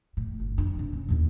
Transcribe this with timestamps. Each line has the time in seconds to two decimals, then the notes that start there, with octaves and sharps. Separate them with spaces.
0.17 A2
0.40 G1
0.58 F#2 D4
0.79 C3
0.93 C#4
1.09 D#2 A2